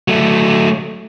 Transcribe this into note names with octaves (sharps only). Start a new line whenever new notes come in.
F#3 A3